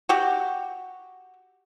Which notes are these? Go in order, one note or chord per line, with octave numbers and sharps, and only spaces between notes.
F#4 G4